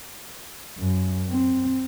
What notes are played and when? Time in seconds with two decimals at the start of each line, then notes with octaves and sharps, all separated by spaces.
0.78 F#2
1.31 C4